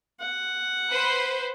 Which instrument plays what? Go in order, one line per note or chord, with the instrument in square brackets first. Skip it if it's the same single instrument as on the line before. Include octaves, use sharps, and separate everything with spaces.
[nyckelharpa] F#5
[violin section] B4 C5